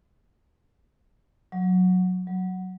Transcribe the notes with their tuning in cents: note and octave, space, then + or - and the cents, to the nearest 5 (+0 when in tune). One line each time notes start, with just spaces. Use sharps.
F#3 -15
F#3 +5